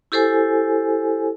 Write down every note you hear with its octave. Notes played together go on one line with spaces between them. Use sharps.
E4 G4 A4 C5 G#5